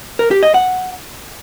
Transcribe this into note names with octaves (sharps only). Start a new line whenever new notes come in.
A#4
G4
D#5
F#5